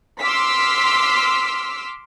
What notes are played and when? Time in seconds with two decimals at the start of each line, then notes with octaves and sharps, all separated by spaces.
0.20 C6 D6 E6 F6 B6